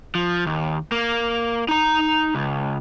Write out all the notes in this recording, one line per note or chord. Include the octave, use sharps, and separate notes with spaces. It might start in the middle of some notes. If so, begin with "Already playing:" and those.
F3
D#2
A#3
D#4 A#5
C#2